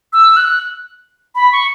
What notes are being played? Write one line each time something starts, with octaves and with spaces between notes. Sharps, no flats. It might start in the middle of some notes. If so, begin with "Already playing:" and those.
E6
F#6
B5
C#6